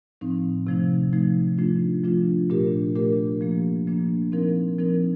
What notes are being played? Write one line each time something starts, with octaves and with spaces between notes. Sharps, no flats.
A2 F3 C4 D#4
C3 F3 A3 D#4
C3 F3 A3 D#4
F3 A3 D4 F4
F3 A3 D4 F4
A#2 A3 D4 G4 A#4
A#2 A3 D4 G4 A#4
F3 A#3 D4
F3 A#3 D4
F3 C4 D#4 A#4
F3 C4 D#4 A#4